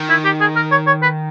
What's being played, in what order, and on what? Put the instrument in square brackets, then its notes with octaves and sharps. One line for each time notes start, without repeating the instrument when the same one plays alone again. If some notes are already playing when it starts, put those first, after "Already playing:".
Already playing: [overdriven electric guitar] D#3
[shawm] E4
G4
G#4
A#4
C#5
C#5
B4